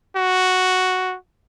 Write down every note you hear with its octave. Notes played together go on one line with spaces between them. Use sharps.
F#4